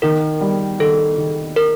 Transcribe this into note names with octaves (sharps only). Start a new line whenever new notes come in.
D#3 A#4
G3
D#3 A4
D#3
A#4